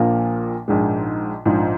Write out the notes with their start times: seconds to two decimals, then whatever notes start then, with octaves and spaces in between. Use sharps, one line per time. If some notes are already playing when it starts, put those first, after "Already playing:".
Already playing: A#1 A#2 F3 A#3 F4
0.68 A#1 G#2 G#3
1.46 A#1 G#2 F3